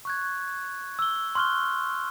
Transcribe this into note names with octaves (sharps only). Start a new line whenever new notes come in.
C#6 F#6 G#6
E6 G7
C6 C#6 F6 F#6 G7